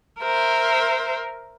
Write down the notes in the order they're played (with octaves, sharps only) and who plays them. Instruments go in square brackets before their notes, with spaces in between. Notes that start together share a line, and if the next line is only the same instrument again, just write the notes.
[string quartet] A#4 C5 E5